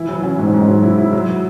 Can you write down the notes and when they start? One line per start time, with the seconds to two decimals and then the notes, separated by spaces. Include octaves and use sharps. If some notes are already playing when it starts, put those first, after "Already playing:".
Already playing: E3 E4
0.08 F#3
0.23 C#4
0.39 G#2
0.54 G#2
0.68 F#3
0.83 E4
0.98 E4
1.13 F#3